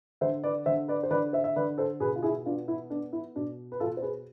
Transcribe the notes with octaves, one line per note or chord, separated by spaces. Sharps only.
D3 C5 E5
B4 D5
D3 C5 E5
B4 D5
C5
D3 B4 D5
C5 E5
E5
D3 B4 D5
A4 C5
B2 G#4 B4
F4
E4 G#4
B3 D4 F4
E4
B3 D4
E4
B2 D4
B4
B2 F4 A4
C5
G#4 B4